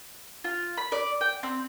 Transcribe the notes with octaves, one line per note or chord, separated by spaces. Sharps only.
F4
B5
D5
G5
C4